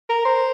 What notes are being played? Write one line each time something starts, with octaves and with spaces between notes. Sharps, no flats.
A#4
C5